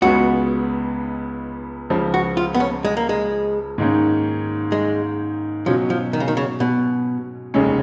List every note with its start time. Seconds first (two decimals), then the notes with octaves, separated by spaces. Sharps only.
0.02 C#2 C#3 G#3 B3 F#4
1.90 C#2 C#3 F3
2.14 F#4
2.37 F4
2.54 B3
2.60 C#4
2.85 G#3
2.97 A#3
3.09 G#3
3.78 G#2 D#3 A#3 C#4
4.72 G#3
5.66 B2 F3 F#3 C#4
5.90 F3
6.13 D#3
6.20 C#3
6.28 D#3
6.37 C#3
6.60 B2
7.54 F1 D#2 C#3 G#3 C#4